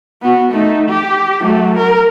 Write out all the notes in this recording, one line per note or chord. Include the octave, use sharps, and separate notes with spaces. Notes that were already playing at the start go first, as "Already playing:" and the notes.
B3 F#4
A3 D#4
G4
F#3 A3
A#4